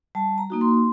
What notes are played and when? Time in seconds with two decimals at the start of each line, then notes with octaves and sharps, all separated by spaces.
0.15 G3 A5
0.38 A#5
0.50 A#3 D#4 F#4
0.61 C6